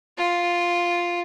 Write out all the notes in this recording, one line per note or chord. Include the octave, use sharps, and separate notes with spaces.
F4